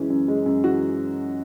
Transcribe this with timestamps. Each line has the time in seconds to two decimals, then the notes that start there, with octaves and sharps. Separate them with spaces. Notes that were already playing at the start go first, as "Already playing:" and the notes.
Already playing: F#2 E3 G#3 C#4
0.10 F#2
0.28 G#3
0.46 F#2
0.64 E3 F#4